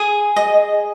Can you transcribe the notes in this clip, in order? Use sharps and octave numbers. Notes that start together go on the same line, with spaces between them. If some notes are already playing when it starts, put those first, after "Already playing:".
Already playing: G#4 G#5
D#5